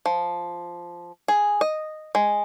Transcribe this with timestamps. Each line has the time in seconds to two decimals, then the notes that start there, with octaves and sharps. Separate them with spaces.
0.06 F3
1.28 G#4
1.61 D#5
2.15 G#3